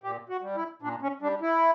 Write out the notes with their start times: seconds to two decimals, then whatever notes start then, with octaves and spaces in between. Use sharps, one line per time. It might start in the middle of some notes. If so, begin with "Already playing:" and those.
0.03 A#2 G4
0.29 F#4
0.42 G3
0.56 E4
0.82 A#2 D4
1.02 C#4
1.21 G3 D4
1.41 E4